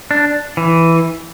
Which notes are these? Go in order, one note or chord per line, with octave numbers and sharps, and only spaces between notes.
D4
E3